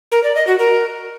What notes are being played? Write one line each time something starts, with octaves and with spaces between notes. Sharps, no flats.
A#4
D5
D#5
F#4
A#4